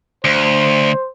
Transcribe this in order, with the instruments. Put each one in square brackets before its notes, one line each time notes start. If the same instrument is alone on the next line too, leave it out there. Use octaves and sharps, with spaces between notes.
[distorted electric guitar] D2 [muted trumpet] C5